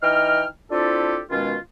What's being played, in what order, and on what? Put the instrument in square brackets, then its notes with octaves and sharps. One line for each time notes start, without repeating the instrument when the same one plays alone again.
[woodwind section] E3 D#4 D#5 G5 F6
C4 D4 E4 F4 G4 A4
B2 D#3 G#3 C#4 F4